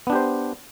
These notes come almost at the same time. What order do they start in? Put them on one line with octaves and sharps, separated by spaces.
B3 D4 G4 C5